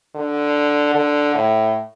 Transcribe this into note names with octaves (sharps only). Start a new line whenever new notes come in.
D3
D3
A2